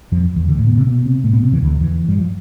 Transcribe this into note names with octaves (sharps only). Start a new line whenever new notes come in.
F2 F3
E2 E3
D2 D3
A2 A3
B2 B3
C3 C4
B2 B3
C3 C4
A2 A3
B2 B3
C3 C4
E2 E3
D2 D3
E2 E3
G2 G3
F3